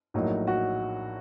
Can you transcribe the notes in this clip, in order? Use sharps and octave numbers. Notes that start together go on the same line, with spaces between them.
A#1 A2 F#3 A#3 D#4
F#4